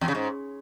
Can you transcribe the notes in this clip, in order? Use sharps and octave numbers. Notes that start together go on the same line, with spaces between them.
E2
C#3
G#2